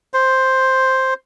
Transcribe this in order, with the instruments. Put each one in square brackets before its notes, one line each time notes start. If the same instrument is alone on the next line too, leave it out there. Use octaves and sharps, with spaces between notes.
[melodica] C5